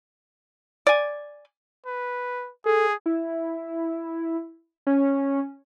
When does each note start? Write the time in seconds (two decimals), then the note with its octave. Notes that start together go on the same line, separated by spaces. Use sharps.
0.87 D5 G#5
1.86 B4
2.66 G#4 A4
3.06 E4
4.87 C#4